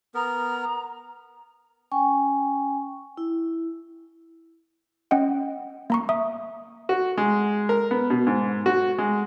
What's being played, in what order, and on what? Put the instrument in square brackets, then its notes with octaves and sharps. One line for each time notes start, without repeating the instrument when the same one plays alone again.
[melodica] B3 A#4 [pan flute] A#5
[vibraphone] C#4 G5 G#5 C#6
E4
[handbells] C#4 D#5 F#5 G5
A#3 A#5 C#6
E5 D#6
[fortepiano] F#4
G#3
A#4
B3
B2
G#2
F#4
G#3